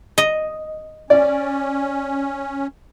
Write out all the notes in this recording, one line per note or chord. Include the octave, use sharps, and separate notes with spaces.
D#5
C#4 D5